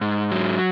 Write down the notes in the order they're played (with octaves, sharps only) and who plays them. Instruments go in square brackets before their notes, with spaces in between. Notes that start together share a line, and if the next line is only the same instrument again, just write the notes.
[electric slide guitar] G#2
F#3